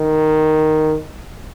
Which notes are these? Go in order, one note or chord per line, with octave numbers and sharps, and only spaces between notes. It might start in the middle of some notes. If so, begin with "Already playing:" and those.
Already playing: D#3